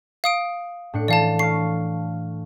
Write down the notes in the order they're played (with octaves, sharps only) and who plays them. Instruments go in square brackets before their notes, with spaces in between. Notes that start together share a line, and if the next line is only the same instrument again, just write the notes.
[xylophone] F5 D#6 D7
[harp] A2 D4 C#7
[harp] E3 A4 [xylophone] D5 F5 A5
[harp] F5 C#6 [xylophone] C7